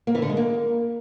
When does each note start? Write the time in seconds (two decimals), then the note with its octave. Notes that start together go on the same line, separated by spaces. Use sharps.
0.07 A#3
0.15 E3
0.22 D3
0.30 G#3
0.37 A#3